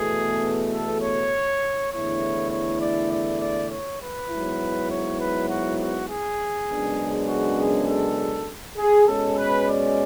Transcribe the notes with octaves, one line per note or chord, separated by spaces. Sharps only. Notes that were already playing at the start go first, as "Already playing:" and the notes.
Already playing: E2 B2 A3 G#4
A4
C#5
E2 D3 A3 E4 C#5
C#5
D5
D5
D5
C#5
B4
G#2 F#3 B3 E4
C#5
B4
F#4
F#4
G#4
F#2 C#3 G#3 B3 D4
F#4
G#4
A4
G#4
B2 G#3 C#4 A4
B4
D5